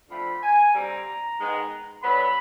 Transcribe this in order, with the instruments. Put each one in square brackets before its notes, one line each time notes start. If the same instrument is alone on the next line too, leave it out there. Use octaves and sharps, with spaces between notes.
[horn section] D3 F3 A3 C4 B5
G#5
D3 G3 C4 A#5
G#2 D#3 G#3 B3
D3 F#3 B3 B5